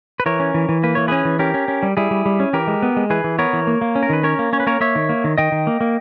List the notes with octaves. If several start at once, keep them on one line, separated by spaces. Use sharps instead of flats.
B4
E3 A#4 C#5
C#4
E3
E3
A#3 B4
E3 C#5
C#4 G#4 B4
E3
C#4 G4 A#4
C#4
C#4
G3
G3 E4 G#4
G3
G3
C#4
E3 G4 A#4
G#3
B3
G#3
E3 G#4 B4
E3
B3 A#4 C#5
E3
A#3
A#3
C#4
A#4
D#3 B4
C#4 A#4 C#5
A#3
C#4 C#5
B4
A#3 A#4 C#5
A#3 C#5 E5
D#3
A#3
D#3
D#3 D#5 G5
D#3
A#3
A#3